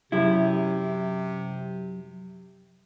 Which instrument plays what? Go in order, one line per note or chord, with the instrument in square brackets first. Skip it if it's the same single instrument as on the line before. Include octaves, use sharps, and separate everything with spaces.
[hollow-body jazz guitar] F#2 E4 [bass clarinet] C3